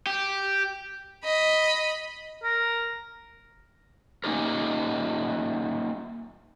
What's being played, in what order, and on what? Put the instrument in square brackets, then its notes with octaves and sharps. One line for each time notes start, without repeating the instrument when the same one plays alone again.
[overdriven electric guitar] G4
[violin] D#5 B5
[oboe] A#4
[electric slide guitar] A#3 C#4 D#4 G4 A#4